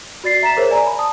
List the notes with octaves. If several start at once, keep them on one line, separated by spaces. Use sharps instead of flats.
F#4 D5 A6 C7
E5 A#5 A6 B6 E7
G#4 A#4 C5 C#5 E5
D5 G#5 A#5
B5
A5 D#6